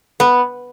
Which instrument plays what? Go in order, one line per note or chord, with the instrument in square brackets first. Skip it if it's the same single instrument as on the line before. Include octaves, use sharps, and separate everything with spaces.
[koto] B3